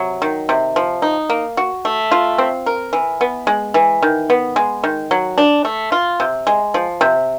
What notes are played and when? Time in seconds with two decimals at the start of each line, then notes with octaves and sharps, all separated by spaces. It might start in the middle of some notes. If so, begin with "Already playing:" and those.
Already playing: C3 F#3
0.22 D#3
0.49 C3
0.76 F3
1.02 D#4
1.30 A#3
1.57 F#4
1.85 A3
2.11 F4
2.38 C4
2.66 A#4
2.93 E3
3.21 B3
3.47 G#3
3.74 E3
4.02 D#3
4.30 B3
4.56 G#3
4.84 D#3
5.11 F#3
5.38 D4
5.65 A3
5.92 F4
6.20 C3
6.47 G#3
6.74 F3
7.01 C3